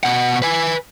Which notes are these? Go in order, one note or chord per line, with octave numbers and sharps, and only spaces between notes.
B2 F#5
B4 G#5